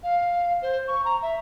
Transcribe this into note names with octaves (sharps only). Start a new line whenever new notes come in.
F5
C5
C#6
A#5
E5